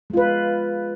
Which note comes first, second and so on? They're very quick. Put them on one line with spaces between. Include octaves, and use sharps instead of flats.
G#3 F4 B4